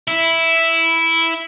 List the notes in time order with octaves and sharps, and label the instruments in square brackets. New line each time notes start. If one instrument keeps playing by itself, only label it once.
[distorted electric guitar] E4